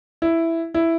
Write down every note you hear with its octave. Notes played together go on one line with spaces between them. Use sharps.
E4
E4